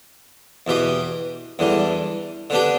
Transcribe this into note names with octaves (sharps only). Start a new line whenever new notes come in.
E2 B2 B3 G4
E2 D3 G3
D3 B3 D4 G4